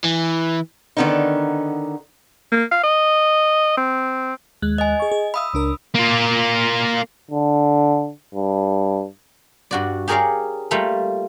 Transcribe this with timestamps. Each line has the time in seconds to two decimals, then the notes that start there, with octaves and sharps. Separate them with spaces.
0.05 E3
0.97 D3 D#3 B3 C#4 D#4
2.52 A#3
2.72 F5
2.84 D#5
3.77 C4
4.62 D#2 G#3 F#6
4.78 D#5 G#5
5.00 G#4 C#6
5.11 G#4
5.34 E5 F5 B5 D#6 E6
5.53 C#2 D4 A#4
5.95 A#3 F4
7.31 D3
8.34 G2
9.71 G2 F#4 D5
10.08 G4 G#4 A#4 C#5 D5 F5
10.71 G3 A3 A#3 F4 A4